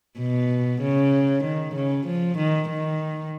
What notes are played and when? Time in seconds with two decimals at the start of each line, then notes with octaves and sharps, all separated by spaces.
0.19 B2
0.82 C#3
1.45 D#3
1.76 C#3
2.07 F3
2.38 D#3
2.69 D#3